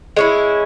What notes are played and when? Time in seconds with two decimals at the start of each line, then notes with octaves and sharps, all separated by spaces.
0.17 G#3 C#4 E4